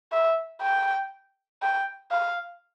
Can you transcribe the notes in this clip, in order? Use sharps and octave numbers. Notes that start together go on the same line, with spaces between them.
E5
G5
G5
F5